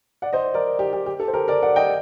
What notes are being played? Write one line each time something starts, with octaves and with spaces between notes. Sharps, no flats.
D5 F#5
C5 D#5
A#4 D5
G4
G4
G4
A4
C5
G4 A#4
A#4 D5
D5 F#5
D#5 G5